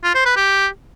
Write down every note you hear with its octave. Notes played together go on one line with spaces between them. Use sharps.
F4
C5
B4
G4